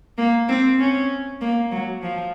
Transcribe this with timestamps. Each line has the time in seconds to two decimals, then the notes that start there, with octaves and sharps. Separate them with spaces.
0.18 A#3
0.49 C4
0.79 C#4
1.41 A#3
1.71 F#3
2.02 F3